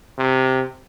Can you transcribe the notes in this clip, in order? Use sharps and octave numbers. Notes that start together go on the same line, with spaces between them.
C3